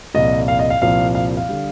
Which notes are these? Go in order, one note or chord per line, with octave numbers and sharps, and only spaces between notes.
C2 A#2 F3 D#5
F5
D#5
F5
C2 A#2 F3 F5
F5
F5
D3 G3